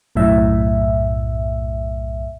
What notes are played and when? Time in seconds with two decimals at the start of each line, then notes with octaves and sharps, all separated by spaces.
0.15 B1 F#2 A2 E5